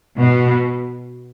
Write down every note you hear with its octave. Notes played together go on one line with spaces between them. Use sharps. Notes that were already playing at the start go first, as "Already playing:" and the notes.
B2